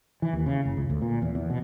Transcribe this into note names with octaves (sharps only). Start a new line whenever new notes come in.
E3
D#2
C#3
F#1
C#2
D2
A#2
E2
E2
B2